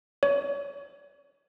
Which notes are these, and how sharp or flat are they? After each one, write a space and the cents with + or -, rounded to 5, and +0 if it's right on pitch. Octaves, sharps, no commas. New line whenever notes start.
C#5 +30